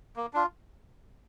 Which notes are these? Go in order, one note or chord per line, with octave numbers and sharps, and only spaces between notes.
A#3
D4 F4